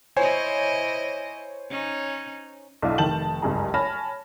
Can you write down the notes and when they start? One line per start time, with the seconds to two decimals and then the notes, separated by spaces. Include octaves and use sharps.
0.16 E4 C5 C#5 D#5 G#5
1.70 C#4 D#4
2.82 B1 D4 E4 F5
2.98 F1 D#3 A5 G6 F#7
3.42 F#1 C#2 G2 G#4 A#5
3.74 C#5 G#5 A5 B5 F6 A#6